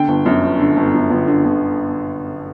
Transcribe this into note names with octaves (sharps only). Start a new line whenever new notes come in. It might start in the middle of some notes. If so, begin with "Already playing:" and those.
Already playing: D3 G5
G1
F#2
G1
D3
G1
F#2
G1
D3
G1